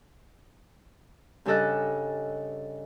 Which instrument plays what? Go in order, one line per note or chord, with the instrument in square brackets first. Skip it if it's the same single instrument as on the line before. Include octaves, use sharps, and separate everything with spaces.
[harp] G2 C#3 G4 A4 D#5 F#6